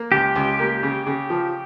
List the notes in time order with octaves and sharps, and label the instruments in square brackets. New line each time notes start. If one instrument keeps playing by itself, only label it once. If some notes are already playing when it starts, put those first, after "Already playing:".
Already playing: [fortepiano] A#3
[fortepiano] C#2 [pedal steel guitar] G4
[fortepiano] C#2
A#3
C#3
C#3
F3